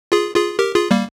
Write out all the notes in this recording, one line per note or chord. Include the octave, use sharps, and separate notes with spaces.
F4 G#4
F4 G#4
G4 A#4
F4 G#4
G3 A#3